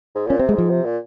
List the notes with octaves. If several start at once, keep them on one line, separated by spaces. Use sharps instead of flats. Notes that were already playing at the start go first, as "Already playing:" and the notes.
G#2
A#2 C#4
C3 C4
G#3
G#2 F3
C3
A#2